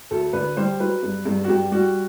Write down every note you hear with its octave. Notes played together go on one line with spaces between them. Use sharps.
D2 A4
D3 B4
G3 C5
F#3 B4
G2
G2
F#4
G2 G4
G3 F#4